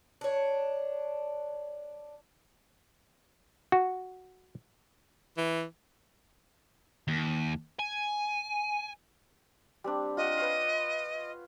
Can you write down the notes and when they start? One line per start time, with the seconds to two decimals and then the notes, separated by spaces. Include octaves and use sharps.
0.21 D4 C#5
3.72 F#4
5.38 E3
7.08 D#2
7.79 G#5
9.84 G3 C4 D4
10.17 F4 D#5 F#5
10.37 B4 C#5 F5